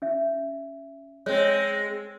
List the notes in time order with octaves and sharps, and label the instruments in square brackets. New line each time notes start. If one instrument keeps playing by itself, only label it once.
[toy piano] C#4 E5
[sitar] G#3 C4 [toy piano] C#5